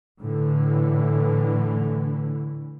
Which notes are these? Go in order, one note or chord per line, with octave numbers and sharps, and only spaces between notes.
A2 D3 E3